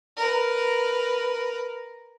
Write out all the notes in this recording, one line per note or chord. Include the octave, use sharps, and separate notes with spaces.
A#4 B4